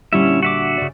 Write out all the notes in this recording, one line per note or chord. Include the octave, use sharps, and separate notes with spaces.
A#2 D3 G3 C#4 E4 E5
F#4 E5 D6
C#3 D5